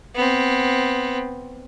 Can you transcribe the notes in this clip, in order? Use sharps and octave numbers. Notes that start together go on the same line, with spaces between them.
B3 C4